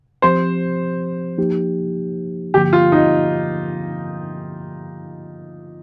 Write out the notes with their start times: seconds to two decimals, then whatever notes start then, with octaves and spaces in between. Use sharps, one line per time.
0.22 F3 C4 G4 C5
1.38 F3 A#3 D#4 G4
2.54 G2 D3 F3 A#3 G4
2.73 F4
2.92 D#4